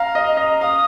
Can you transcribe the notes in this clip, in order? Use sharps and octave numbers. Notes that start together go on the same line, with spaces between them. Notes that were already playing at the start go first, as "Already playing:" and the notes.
Already playing: F5 A#5
D#5
D#5
F5 D#6